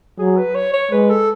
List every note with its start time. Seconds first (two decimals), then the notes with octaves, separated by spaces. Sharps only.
0.19 F#3 G#4
0.37 B4
0.55 C#5
0.74 C#5
0.91 G#3 B4
1.10 A4